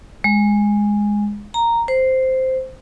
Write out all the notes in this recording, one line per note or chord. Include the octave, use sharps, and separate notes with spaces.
G#3
A#5
C5